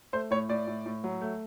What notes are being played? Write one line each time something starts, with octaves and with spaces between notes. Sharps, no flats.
A3 C5
A2 C#5
A2 D5
A2
A2
F#3
A3